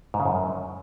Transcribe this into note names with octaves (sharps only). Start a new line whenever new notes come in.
G#2
C#3
F#2